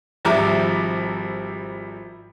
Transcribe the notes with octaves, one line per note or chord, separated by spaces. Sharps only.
G#1 F3 G3 E5 A#5 D6